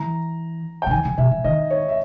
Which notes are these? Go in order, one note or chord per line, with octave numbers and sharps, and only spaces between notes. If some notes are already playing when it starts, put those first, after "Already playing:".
Already playing: E3 A#5
G5
C#3
D#3 G#5
C#3
B2 E5
C#3
D#3 D#5
C#5
E5